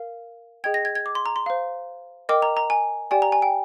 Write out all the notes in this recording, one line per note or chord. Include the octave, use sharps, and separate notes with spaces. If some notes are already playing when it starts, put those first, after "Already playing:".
Already playing: A#4 F5
G#4 D#5 G5 G#6
A#6
G#6
G#6
D6
C6
A#5
C6
C5 F5
A#4 D#5 G5 D6
A#5
A#5
G#5
G4 D5 G5 G#5
A#5
G#5
G5